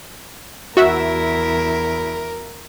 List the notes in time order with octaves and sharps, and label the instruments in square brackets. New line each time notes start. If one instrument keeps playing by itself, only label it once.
[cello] E2 E4 [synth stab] F#4 E5 [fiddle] A#4